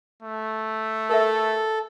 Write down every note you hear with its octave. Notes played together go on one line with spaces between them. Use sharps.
A3
A4 A#4 E5